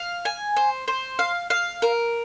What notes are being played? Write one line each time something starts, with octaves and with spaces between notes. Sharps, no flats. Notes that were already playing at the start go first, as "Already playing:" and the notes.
Already playing: F5
G#5
C5
C5
F5
F5
A#4